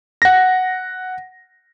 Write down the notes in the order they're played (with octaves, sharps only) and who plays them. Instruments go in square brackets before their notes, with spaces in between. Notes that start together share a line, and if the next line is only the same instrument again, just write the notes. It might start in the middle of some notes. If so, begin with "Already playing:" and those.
[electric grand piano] F#5 A#6